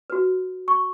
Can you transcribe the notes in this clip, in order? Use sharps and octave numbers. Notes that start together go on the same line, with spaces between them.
F#4 B4
C#6